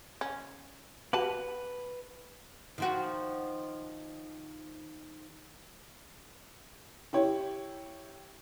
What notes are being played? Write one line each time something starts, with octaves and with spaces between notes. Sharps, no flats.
C#4
F#4 G4 B4 A5
D#3 F3 F#4
E4 G4 C#5